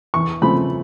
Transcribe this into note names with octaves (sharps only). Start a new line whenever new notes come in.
E2 C#6
C#3 F3 A3 C4 B5